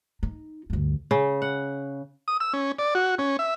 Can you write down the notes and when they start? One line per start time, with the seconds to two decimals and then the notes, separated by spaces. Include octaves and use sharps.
0.23 D#4
0.70 D2 G2
1.11 C#3
1.42 F#5
2.28 D#6
2.40 E6
2.53 C#4
2.79 D5
2.95 F#4
3.19 C#4
3.39 E5